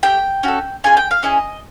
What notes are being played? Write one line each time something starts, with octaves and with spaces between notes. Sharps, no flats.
A3 D4 G4 G5
C#4 F#4 A4
C#4 F4 G#4 G#5
G5
F5
C#4 E4 G#4 D#5